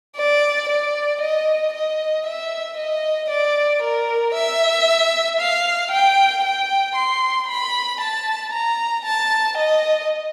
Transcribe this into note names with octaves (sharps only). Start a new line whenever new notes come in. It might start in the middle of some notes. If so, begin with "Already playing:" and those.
D5
D5
D#5
D#5
E5
D#5
D5
A#4
E5
F5
G5
G5
C6
B5
A5
A#5
A5
D#5